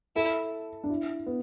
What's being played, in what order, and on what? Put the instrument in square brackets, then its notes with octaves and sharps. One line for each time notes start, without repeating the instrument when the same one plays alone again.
[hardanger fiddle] E4 [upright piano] A4
[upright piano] D4
E4
B3